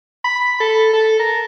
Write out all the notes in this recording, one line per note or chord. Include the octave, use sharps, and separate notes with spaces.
B5
A4
A4
A#4